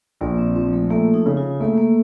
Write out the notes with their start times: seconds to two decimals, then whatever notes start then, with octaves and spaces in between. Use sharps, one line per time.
0.21 A#1 A#3
0.38 C4
0.56 F3 C4
0.73 A3
0.90 A3 A#3
1.14 D#4
1.26 C#3
1.37 F4
1.60 A3 A#3
1.78 A#3